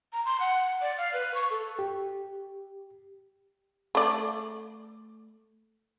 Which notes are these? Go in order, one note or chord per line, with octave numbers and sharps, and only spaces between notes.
A#5
C6
F#5
D5
F5
B4
C#6
A4
G4
A3 D5